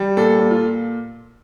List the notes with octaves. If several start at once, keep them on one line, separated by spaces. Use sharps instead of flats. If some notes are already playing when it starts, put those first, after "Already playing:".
Already playing: G3
A#2 A4
A#2
F4